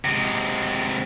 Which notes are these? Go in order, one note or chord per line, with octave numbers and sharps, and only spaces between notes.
C3 G#3